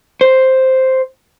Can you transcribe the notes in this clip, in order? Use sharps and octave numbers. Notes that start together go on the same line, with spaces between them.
C5